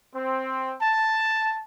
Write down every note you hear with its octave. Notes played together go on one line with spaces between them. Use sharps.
C4
A5